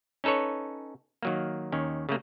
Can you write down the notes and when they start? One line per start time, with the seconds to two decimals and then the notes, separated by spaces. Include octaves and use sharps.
0.24 C#4 D#4 A4 B4 C#5
1.23 D#3 F#3 A#3
1.72 D#2 D#3 C#4
2.09 C#3 A3 A#3